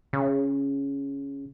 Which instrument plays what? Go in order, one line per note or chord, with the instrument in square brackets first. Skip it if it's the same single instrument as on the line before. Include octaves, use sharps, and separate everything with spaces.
[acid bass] C#3